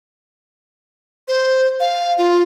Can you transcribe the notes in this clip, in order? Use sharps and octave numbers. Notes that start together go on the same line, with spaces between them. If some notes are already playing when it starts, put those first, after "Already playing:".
C5
F5
F4